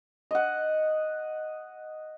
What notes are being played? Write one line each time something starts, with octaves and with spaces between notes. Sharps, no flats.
D#5 F#5